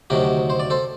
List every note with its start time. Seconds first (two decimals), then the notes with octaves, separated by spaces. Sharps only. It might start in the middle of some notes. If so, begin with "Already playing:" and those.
0.10 D2 C3 D#3 F#3 G4 A#4
0.50 C5
0.60 D5
0.70 A4 C5